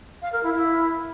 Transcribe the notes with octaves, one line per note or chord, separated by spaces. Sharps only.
F5
A#4
E4
E4